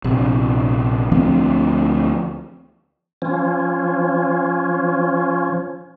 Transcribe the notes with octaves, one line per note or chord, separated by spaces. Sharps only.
A#1 C3
D2 F3 C4
F3 C#4